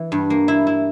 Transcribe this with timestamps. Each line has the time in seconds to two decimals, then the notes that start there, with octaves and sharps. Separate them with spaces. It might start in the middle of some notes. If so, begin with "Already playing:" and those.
Already playing: E3
0.12 G2
0.30 A#3
0.48 E4
0.67 E4